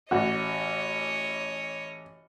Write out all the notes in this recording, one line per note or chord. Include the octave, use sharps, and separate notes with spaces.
A1 F#4 C#5 D#5